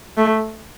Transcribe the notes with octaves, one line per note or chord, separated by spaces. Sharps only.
A3